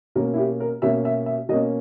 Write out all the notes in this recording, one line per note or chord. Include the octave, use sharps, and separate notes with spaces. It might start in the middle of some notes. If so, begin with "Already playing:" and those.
B2 A#3 C#4 A#4
E4
G4
A#4
B2 A#3 C#4 E5
E5
E5
B2 A#3 C#4 D#5